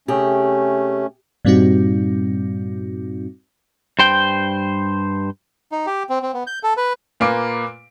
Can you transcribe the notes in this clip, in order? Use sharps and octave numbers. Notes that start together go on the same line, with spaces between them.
C3 A3 C#4 G4 G#4
G2 A#2 G3 C4 D#4 F#4
G2 C5 G5
D#4
G4
C4
C4
B3
G6
A4
B4
A#2 A#3 F4 B4 D6 D7